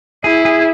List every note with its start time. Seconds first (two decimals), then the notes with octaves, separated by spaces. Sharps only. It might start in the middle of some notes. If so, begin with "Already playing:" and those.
0.24 E4 G#4
0.45 G#4